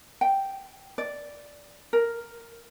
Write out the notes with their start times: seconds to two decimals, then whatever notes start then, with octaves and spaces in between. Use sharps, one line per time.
0.21 G5
0.98 D5
1.93 A#4